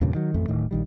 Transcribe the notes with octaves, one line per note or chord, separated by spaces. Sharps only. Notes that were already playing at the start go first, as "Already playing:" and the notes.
E2 G2 A#2 C#3
D#3 F#3
A1 F2 A3
D1 A2 D#3
A#1 D#3 G3